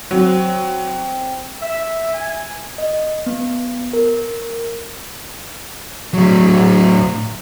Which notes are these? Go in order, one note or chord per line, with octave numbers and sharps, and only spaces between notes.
F#3 C4
E5
G#5
D#5
B3
A#4
A2 F#3